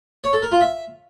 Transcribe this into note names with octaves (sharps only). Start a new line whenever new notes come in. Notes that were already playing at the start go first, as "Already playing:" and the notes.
C#5
A4
A#4
F4
E5